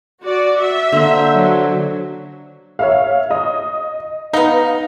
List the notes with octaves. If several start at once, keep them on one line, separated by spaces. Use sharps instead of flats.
F#4 D5
E5
D3 A#3 C5
F#3
C#5 E5 F5
D#5 D#6
B3 D#4 F5